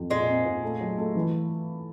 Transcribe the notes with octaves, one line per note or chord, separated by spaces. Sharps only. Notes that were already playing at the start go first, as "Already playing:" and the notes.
Already playing: F2
A#2 G#3
C4
A#2
A3
F#3
A3
E3